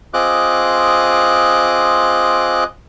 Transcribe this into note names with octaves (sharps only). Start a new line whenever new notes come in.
C4 F4 G#4 D#5 D6 F#6